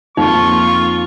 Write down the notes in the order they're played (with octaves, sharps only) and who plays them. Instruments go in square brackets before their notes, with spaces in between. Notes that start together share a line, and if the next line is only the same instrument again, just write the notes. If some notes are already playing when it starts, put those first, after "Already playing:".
[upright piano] F2 [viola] A#3 F4 [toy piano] D#4 [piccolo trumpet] C#6